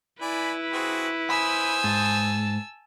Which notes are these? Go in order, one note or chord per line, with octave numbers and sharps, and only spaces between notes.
E4 B4 D5 G#5 B5
C4 F#4 G#4
C5 G#5 B5 D#6 E6
G#2 A5